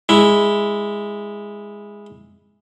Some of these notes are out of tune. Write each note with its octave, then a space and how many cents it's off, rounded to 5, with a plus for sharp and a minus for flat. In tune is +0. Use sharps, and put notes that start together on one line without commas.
G#3 -10 E4 -5